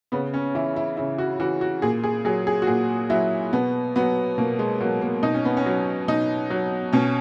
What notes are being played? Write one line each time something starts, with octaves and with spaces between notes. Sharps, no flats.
C#3 B3
C#4
E3 E4
E4
C#3 E4
F#4
E3 F#4
F#4
A#2 G#4
G#4
F#3 G#4
G#4
F#4
A#2 G#4
F#3 E4
B2 B3
F#3 B3
B2 A#3
G#3
F#3 A#3
A#3
B2 D#4
C#4
B3
C#4
F#3
B2 D#4
F#3
B2 C#4